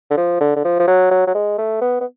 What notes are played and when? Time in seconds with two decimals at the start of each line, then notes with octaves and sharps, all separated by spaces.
0.11 D3
0.17 F3
0.41 D3
0.56 D3
0.65 F3
0.79 F3
0.88 F#3
1.11 F#3
1.27 F#3
1.35 G#3
1.58 A3
1.81 B3
2.01 B3